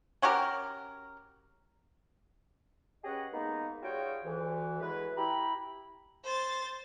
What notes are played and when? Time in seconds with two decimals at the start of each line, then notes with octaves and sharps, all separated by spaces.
0.22 C#4 F#4 G4 A#4
3.04 C#4 G4 G#4 B4 D#5 F#5
3.32 G#3 A#3 B3 D#4
3.83 G3 F4 F#4 G#4 C#5 G5
4.25 D2 E3
4.80 F#3 G#3 A3 E4 B4
5.17 E4 G4 A#5 B5
6.24 C5 A6